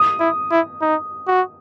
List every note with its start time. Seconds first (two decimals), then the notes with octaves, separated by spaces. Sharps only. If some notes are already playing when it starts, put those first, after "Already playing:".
Already playing: D#6
0.20 E4
0.51 E4
0.81 D#4
1.28 F#4